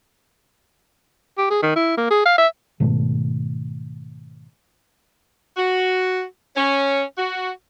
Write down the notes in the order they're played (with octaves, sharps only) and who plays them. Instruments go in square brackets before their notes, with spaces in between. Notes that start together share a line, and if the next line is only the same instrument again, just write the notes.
[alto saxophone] G4
G#4
D#3
E4
A#3
G#4
F5
E5
[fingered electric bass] G#2 B2 D#3 A3
[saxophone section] F#4
C#4
F#4